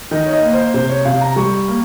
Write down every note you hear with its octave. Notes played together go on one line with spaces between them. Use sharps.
D#3 D#5
C#5
D#5
A#3
C5
C3 C5
C#5
C3 F5
A#5
G3 C#6
A#3